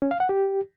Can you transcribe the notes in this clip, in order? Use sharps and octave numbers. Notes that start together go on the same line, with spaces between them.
C#4
F5
F#5
G4